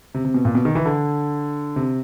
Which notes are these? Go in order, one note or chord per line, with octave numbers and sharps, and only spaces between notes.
C3
C3
B2
A#2
B2
D#3
E3
D3
C3